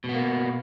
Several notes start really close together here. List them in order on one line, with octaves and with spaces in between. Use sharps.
B2 B3 A#3